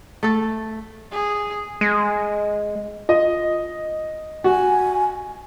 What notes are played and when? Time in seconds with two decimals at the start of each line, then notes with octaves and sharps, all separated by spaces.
0.23 A3 A4
1.12 G#4
1.81 G#3
3.09 F4 D#5
4.44 F#4 G#5